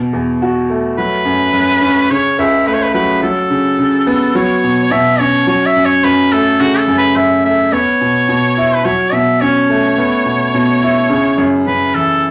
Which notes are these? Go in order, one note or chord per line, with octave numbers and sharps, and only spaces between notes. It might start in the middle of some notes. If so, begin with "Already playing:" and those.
Already playing: B2
E2
F#4
A3
F#3 B4
F#2
F#2
C#4
C#3 C#5
C#2 E5
A3 B4
C#5
B4
F#3 B4
F#3 A4
C#3
C#3
B3
F#3 C#5
B2
C#5
B2 E5
C#4 C#5
F#3 C#5
E5
F#2
C#5
F#2 B4
A3 A4
C#3 F#4
A4
F#2
B4
F#2 E5
A3 E5
B3 C#5
B2
B2
E4
B4
F#3 C#5
B2 E5
C#4 C#5
A3
B3
B2
B2
E4
C#3
F#2
F#2 B4
E3 A4